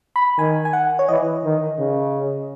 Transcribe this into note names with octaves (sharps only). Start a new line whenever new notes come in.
B5
D#3 G#5
G#5
F#5
C#5
E3 D#5
D#3
C#3